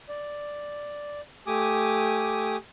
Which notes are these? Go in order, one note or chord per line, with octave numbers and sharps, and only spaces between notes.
D5
A3 G4 G#5 D6 D#6